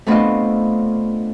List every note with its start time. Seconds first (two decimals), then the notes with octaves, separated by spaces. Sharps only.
0.07 A3 B3 C4 D4 F4 D#5